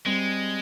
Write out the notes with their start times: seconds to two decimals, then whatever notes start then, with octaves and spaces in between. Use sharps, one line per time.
0.06 G3 G#3 C4